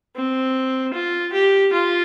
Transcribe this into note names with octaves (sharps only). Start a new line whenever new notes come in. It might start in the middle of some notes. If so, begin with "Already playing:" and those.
C4
F4
G4
F4